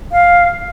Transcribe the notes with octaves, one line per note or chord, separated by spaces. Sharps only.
F5